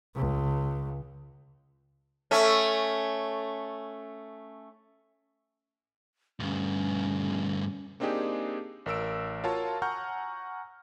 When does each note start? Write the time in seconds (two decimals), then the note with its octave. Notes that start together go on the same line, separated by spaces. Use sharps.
0.16 C#2
2.31 A3 C#4
6.40 D2 G2 C#4
8.00 A#3 C4 D4 D#4 G4 G#4
8.86 A1 A#4 E6 D7
9.44 F4 F#4 A#4 C#5 F5 A5
9.82 F#5 G#5 A#5 C#6 F6 G6